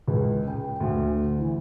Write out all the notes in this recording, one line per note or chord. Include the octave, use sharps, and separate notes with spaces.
C#2
G5
D2
E3